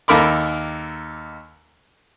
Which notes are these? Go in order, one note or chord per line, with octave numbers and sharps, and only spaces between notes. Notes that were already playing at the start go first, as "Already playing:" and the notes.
D#2 A#3 A4 A#4 B5 D6